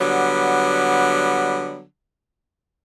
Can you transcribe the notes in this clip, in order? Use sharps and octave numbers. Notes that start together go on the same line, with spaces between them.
D3 F#3 G3 B3